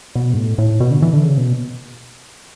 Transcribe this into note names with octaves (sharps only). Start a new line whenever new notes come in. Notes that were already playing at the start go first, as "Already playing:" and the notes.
B2
G2
A2
A2
B2
D3
E3
D3
C#3
B2